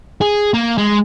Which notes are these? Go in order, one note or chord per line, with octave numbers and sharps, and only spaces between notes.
G#4
A#3
G#3